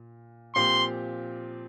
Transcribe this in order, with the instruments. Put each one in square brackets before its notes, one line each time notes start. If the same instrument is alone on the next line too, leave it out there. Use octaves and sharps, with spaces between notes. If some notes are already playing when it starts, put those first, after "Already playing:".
Already playing: [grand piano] A#2
[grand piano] A#2 F3 C4 G4 [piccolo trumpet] C6